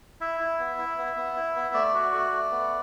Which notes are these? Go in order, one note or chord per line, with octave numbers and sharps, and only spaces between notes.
E4 E5
E4
B3
E4
B3
B3
E4
B3
A3 D5
F#4
A3
A3
B3